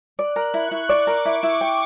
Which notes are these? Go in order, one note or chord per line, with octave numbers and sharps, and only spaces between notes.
D5 F#6
A#4
E4 C#6
E4
D5 D6
A#4
E4 C#6
E4
G5